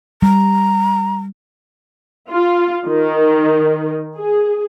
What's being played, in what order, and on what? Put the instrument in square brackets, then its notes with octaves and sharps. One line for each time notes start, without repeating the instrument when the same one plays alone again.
[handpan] G3 [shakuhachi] A#5
[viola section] F4
D#3
G#4